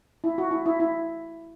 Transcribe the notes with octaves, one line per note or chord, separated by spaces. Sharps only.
E4
F#4
E4
E4
E4